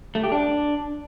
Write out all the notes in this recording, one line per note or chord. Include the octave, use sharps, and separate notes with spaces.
A3
G4
D4